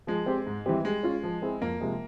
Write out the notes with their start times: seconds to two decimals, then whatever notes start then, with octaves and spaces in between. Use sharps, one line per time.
0.07 F3 G#3
0.26 C4 G4
0.47 G#2
0.66 E3 G3 C4 G4
0.85 G3 G#3
1.03 C#4 F4
1.23 F3
1.42 C4 E4 G#4
1.61 F2 A#3
1.80 C3 F3 G#3